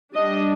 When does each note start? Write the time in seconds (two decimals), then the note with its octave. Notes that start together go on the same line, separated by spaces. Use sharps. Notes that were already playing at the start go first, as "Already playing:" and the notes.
0.15 G3 D4 D#5